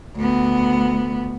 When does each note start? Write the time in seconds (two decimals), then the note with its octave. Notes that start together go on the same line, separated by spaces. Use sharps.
0.17 D2 B3